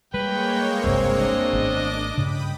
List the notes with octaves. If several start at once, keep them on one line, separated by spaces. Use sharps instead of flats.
G3 G#3 A#3 B4 C#5 G5
F#1 C2 G2 C4
D4 D#5
G#1 A3 B3 D6
G2 C#3 G5 B5 D#6